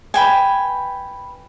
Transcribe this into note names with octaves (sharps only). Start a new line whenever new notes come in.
B4 G5 G#5